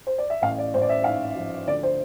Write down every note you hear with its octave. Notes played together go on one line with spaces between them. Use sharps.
C5
D5
E5
A1 F5
D5
A1 C5
D5
E5
G#2 F5
F3
D2 D5
C5